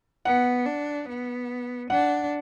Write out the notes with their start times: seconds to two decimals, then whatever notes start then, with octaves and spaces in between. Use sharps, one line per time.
0.25 B3 F#5
0.66 D4
1.08 B3
1.90 D4 F#5